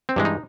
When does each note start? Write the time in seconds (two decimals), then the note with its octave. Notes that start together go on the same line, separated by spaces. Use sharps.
0.09 C4
0.16 G2 E3 G#3
0.25 D#4